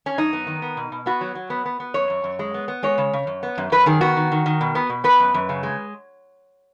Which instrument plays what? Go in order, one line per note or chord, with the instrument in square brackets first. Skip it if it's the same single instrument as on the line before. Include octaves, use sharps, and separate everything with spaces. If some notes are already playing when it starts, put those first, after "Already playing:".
[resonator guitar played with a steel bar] C#4
F#2 D#4
B3
D#3
B3
B2
B2
B3 F#4
F#3
F#3
B3
B3
B3
F#2 C#5
F#2
F#2
G#3
B3
B3
G#3 C#5
C#3
C#3
F#2
B3
F#2
F#2 B4
D#3 G#4
B3 F#4
D#3
D#3
D#3
B2
B3
B2
B3 B4
F#2
F#2
C#3
G#3